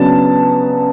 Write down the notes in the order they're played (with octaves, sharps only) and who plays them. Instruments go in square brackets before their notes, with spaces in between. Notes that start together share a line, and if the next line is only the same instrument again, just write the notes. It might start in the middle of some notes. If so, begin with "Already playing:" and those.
Already playing: [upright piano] C#3 F#3 B3 D4 A5